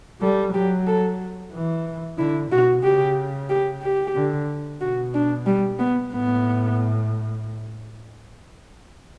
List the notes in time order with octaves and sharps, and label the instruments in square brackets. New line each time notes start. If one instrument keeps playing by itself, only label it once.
[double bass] G3 [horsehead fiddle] A4
[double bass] F#3 [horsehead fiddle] G4
[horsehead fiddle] A4
[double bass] E3
[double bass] D3 [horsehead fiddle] E4
[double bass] B2 [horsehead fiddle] F#4
[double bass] C#3 [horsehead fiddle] G4
[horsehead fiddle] G4
G4
[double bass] D3
[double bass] B2 [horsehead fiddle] F#4
[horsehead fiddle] D4
G3
B3
[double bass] A2 [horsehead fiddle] B3